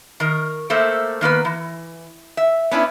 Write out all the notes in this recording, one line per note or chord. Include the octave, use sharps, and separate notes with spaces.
D#3 A#4
A3 A#3 A4 A#4 C5 E5
D#3 A#3 B3 B4
E3
E5
B3 C#4 D4 E4